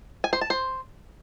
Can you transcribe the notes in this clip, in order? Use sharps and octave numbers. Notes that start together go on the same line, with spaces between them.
G#5
C5
A5
C5